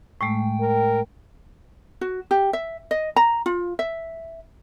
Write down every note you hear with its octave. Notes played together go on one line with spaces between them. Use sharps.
A2 G#3 A3 G5
A#4
F#4
G4
E5
D#5
A#5
F4
E5